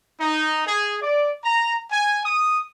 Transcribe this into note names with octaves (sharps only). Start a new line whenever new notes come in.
D#4
G#4
D5
A#5
G#5
D#6